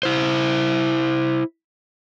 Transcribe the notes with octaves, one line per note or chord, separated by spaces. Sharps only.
E4 C5